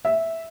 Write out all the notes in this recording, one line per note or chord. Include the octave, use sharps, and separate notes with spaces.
E5